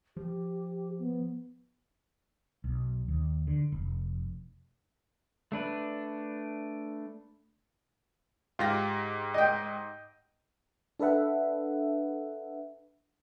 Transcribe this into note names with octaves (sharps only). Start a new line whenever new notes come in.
F3 G4
B3
B1
D#2
D3
F1
A3 D4 B4
G#2 F4 G4 A#6
D#5 G5
D4 A4 B4 E5 F#5